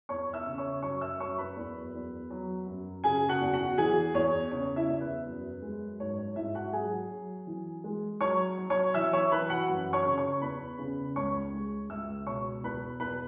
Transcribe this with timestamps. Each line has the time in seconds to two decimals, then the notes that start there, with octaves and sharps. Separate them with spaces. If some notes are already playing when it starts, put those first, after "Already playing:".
0.09 E2 C#5 C#6
0.33 E5 E6
0.46 C#3
0.58 C#5 C#6
0.82 F#2 C#5 C#6
1.01 E5 E6
1.19 F#2 C#5 C#6
1.38 B4 B5
1.56 E2
1.94 E2
2.30 F#3
2.67 F#2
3.04 C#3 G#4 G#5
3.28 F#4 F#5
3.41 E2
3.53 F#4 F#5
3.78 E3 G#4 G#5
4.14 E2 C#5
4.51 C#3 C#5
4.76 E4 E5
4.88 E2
5.00 B4
5.26 F#2
5.62 G#3
6.00 G#2 C#5
6.18 C#5
6.36 G#2 E4 E5
6.55 F#4 F#5
6.73 F#3 G#4 G#5
7.11 F#3
7.47 E3
7.84 G#3
8.21 F#3 C#5 C#6
8.58 F#3
8.70 C#5 C#6
8.94 E3 E5 E6
9.13 C#5 C#6
9.32 E3 B4 B5
9.50 F#4 F#5
9.69 F#2
9.93 C#5 C#6
10.06 C#3
10.18 C#5 C#6
10.42 E2 B4 B5
10.79 C#3
11.16 C#2 C#5 C#6
11.54 G#3
11.89 C#2 E5 E6
12.26 B2 C#5 C#6
12.63 E2 B4 B5
13.00 E2 B4 B5